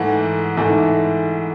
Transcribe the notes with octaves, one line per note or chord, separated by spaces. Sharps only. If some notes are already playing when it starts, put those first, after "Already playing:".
Already playing: G#2 E3 A3 F#5
G#2 E3 A3